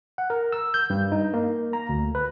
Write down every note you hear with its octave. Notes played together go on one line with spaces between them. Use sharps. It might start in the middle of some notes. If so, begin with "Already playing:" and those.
F#5
A#4
E6
G6
G2
D#4
A#3
A#5
D2
B4